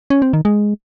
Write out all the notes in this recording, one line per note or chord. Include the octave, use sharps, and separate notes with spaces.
C#4
C4
D#3
G#3